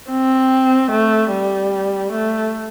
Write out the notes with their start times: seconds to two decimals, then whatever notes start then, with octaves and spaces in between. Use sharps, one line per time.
0.10 C4
0.91 A3
1.31 G3
2.12 A3